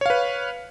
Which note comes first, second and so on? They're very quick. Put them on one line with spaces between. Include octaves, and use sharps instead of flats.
C#5 F5 B4